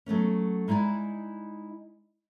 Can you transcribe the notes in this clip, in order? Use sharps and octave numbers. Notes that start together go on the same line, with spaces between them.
F#3 A3 B3 C#4
G#3 D#4 E4 D5 G#5